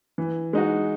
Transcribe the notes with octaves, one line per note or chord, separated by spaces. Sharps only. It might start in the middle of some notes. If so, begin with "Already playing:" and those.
E3
G#3 D#4 F#4